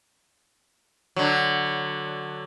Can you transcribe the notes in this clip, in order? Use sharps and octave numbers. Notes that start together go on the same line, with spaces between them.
D3 F#3